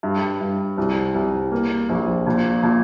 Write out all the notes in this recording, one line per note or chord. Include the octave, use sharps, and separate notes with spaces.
G2
G2
C2
C2
A#3
A#1
A#2
A#2